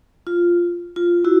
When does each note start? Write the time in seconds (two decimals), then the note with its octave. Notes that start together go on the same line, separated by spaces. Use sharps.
0.27 F4
0.96 F4
1.25 E4 F#4